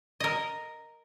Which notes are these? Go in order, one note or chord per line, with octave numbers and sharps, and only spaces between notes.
A#4 D#5